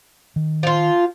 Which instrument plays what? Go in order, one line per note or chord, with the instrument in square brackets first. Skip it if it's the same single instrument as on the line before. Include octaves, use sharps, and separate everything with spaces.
[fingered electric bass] D#3
[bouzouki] F3 F4